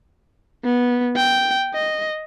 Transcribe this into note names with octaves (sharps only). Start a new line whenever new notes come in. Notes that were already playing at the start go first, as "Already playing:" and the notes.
B3
G5
D#5